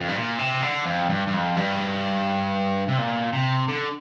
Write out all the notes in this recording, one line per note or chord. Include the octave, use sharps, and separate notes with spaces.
F2
G2
A#2
C3
D3
F2
G2
G2
F2
G2
C3
A#2
C3
D3